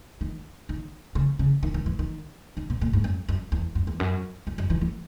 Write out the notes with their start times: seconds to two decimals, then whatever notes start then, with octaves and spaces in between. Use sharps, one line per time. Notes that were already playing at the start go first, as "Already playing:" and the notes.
0.21 D#3
0.69 D#3
1.15 C#3
1.39 C#3
1.63 D#3
1.74 D#3
1.86 E3
1.99 D#3
2.57 D#3
2.70 B2
2.81 A#2
2.93 G#2
3.04 F#2
3.29 F#2
3.52 E2
3.75 F#2
3.87 E2
4.00 F#2
4.47 F#2
4.58 F#2
4.70 E3
4.81 E3